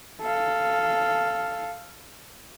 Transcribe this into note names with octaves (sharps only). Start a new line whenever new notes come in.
A4 F5